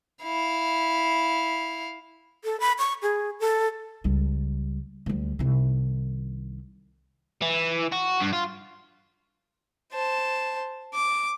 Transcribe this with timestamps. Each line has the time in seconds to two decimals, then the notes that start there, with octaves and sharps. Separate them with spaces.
0.23 E4 F5
2.45 A4
2.60 B5
2.79 C#6
3.03 G#4
3.40 A4
4.04 C#2 G3
5.06 D2 G3
5.39 C2 D#3
7.42 E3
7.92 F#4
8.21 G2
8.33 F4
9.92 C5 A5
10.94 D6